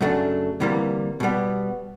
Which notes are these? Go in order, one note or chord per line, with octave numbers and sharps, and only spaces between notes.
F#2 C#3 F#3 A3 D4
D2 C3 E3 G3 A#3
B2 G3 B3